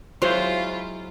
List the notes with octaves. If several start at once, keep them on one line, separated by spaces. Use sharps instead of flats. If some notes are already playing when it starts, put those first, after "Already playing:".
F#3 G#3 E4 F4 C5 C6